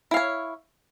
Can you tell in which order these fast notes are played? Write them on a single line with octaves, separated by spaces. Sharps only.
E4 F5 C#5